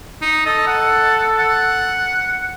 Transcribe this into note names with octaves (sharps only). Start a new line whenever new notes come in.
D#4
A4 D#5
F#5
F#5